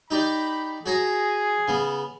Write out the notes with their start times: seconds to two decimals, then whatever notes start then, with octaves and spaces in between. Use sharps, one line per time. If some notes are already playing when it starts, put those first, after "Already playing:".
0.11 D#4 G4 D5 B5
0.86 F#4 G#4 C#5 A#5
1.68 C#3 B3